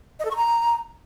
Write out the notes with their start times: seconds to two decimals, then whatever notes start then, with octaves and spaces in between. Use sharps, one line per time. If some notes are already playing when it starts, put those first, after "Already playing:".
0.20 D#5
0.25 A4
0.31 C#6
0.36 A#5